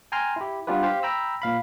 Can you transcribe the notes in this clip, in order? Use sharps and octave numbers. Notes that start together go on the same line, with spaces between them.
G5 G#5 A#5 C6 F6
E4 G4
G3 B3 D4 F4 G4 B4
G4 C5 F5
G5 A#5 B5 E6
A#2 F5 B5